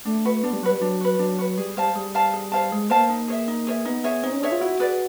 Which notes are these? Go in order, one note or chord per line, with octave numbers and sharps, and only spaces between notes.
A3 D4
F#4 B4
B3 D4
G3
F#3 F#4 B4
G3
F#3 D4
F#4 B4
F#3 D4
F#4 B4
G3 G#4
G3 C5 F5 A5
G3 G#4
C5 F5 A5
G#4
C5 F5 A5
G#3 G#4
A#3 C5 F5 A5
D#4
G#4 C#5 E5
D#4
G#4 C#5 E5
B3 D#4
G#4 C#5 E5
C4 D#4
C#4
D4 G#4 C#5 E5
F4
E4 F#4
G#4 B4 D5